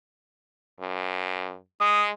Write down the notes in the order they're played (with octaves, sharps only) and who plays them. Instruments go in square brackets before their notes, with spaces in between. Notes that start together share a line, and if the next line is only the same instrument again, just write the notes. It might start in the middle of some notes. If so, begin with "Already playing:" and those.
[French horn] F#2
[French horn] G#3 [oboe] D#6